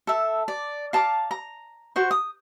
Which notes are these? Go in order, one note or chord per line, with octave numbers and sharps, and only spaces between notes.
A4 E5
D5
F5 A5 A#5 D6
A#5
F#4 C5 C#6
D#6